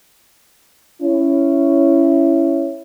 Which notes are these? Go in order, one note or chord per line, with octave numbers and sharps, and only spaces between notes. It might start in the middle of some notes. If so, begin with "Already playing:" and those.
C#4 E4